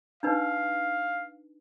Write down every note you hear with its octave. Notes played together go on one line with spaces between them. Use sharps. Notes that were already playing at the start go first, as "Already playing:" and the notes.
D4 D#4 B4 F5